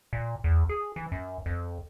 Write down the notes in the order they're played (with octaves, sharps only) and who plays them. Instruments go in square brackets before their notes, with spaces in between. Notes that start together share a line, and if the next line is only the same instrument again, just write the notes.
[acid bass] A#2
E2
G#4
E3
F#2
F2